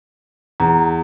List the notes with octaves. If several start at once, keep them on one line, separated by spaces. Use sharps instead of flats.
E2 A#5